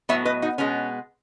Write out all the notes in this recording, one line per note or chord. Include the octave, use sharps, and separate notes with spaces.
A2 F#3 B3 C#5 E5
B4 D#5
D#4 F#4
B2 G#3 B3 C#4